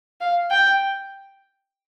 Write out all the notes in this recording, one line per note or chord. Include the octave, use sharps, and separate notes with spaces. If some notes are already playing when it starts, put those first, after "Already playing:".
F5
G5